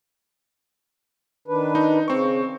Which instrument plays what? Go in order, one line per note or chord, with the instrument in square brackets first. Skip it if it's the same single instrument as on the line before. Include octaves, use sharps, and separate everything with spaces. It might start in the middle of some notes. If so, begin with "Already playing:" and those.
[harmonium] D#3 D4 B4
[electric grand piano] D#4
[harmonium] C#3 [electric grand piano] C4 C#6